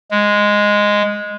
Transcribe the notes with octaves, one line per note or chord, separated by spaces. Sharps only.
G#3